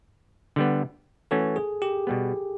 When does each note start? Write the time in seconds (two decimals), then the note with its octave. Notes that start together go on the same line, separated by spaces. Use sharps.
0.56 D3 G3 B3
1.31 E3 A3 C#4 F#4 A4
1.56 G#4
1.82 G4
2.07 B2 G3 B3